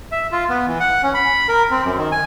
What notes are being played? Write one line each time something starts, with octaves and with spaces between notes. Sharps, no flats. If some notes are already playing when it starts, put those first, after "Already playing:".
E5
F4
B3
E3
F#5
C#4
B5
A#4
C4
F#2
D#3
G#5